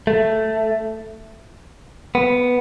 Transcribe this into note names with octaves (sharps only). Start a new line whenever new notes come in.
A3
B3